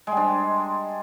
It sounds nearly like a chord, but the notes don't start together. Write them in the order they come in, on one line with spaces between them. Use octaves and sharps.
G#3 G3 D4